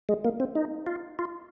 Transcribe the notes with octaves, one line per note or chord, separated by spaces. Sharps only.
G#3
A#3
C4
D#4
F4
F4